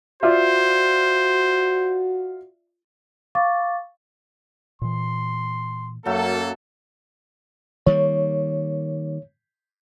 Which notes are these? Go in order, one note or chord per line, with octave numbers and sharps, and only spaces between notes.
F4 F#4 C5 D5 E5
F5 C#6 D6 A6
A#2 E3 C6
F#2 F#3 A3 A#3 A4
D#3 G3 A#3 C#5